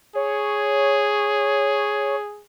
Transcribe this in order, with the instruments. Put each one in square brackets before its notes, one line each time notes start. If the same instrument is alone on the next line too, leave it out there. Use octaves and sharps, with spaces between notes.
[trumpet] G#4 [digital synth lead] C#5